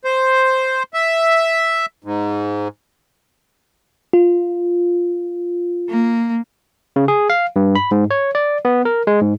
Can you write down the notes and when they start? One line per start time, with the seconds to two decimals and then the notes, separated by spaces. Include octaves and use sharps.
0.05 C5
0.94 E5
2.04 G#2
4.13 F4
5.89 A#3
6.96 C#3
7.08 G#4
7.30 F5
7.56 G2
7.75 B5
7.91 G#2
8.11 C#5
8.35 D5
8.65 B3
8.85 A#4
9.07 G#3
9.21 G#2